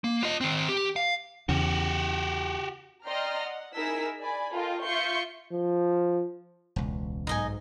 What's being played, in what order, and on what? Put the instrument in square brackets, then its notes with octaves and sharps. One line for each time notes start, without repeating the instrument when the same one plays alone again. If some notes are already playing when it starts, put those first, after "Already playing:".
[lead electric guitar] A#3
F4 D#5
D#3 C4
G4
F5
[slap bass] E2 C#3 [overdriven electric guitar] F#4 G4
[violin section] D5 D#5 G5 A#5 C6 F6
F#5
D#4 E4 G#4 A#4 E6 B6
D5 G#5 B5
F4 A4 A#4 D#5 G5
F4 E5 C#6 G6 C7 C#7
[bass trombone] F3
[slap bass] E1 C#2
[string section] B1 G#2 [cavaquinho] D#4 D#5 G#5